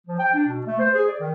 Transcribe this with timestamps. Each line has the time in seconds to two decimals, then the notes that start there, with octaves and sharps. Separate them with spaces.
0.07 F3
0.19 G5
0.34 D4
0.47 B2
0.65 A3
0.78 C5
0.93 G#4
1.07 D5
1.20 D#3